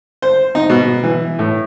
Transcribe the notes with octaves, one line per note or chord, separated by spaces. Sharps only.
C5
D#4
B2
E3
A2